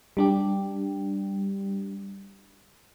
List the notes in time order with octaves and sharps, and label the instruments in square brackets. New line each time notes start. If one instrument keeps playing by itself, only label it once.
[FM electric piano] G3 D4 G4